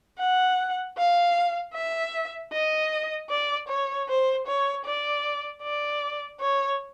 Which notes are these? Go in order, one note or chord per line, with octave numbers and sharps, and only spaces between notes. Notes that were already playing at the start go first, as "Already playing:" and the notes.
F#5
F5
E5
D#5
D5
C#5
C5
C#5
D5
D5
C#5